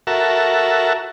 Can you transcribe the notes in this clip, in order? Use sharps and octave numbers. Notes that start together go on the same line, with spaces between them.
F#4 A4 A#4 E5